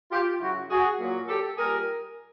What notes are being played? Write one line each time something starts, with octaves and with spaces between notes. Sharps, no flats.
F4 G4
F#2 C#3 F#3 E4 F#4
F#4 G#4
A#2 F#3
G4 A4
A#2 G3 G#4 A#4